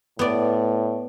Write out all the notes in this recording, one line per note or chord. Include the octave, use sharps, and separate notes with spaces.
A2 B3 D5